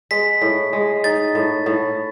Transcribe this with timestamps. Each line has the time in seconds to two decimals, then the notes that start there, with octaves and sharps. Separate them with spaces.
0.11 G#3 B6
0.42 A2
0.73 G#3
1.04 D#4 A6
1.35 A2
1.66 A2